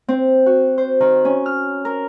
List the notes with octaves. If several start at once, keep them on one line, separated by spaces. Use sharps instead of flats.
C4
F#4
C5
D#3
C#4
F6
A#4